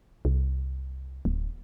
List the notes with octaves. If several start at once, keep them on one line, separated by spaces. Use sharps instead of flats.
C2
D1